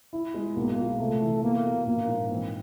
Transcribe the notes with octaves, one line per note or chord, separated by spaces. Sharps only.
E4
G#3
B1 A#3
A#2
C3 A3
E3
A#3 B3
B2
A#1 A#3
G#2
E3 C4